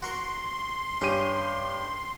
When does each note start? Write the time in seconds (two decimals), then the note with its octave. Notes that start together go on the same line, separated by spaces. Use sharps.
0.02 F#4 A#4 C6 C#6
1.01 G2 C#4 G4 D#7